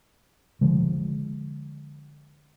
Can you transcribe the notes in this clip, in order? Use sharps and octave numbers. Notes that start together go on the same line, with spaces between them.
D3 F3 G#3